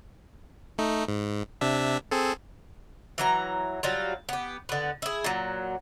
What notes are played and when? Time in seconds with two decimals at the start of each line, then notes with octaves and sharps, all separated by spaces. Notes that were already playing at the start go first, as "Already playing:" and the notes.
0.78 A3 D#4
1.08 G#2
1.61 C3 D4 E5
2.11 C4 G#4 A4
3.18 E3 F#3 A#5
3.83 F#3 G3 F4
4.29 B3 G4
4.69 D3 B3
5.02 E4 G#4
5.24 A#2 F#3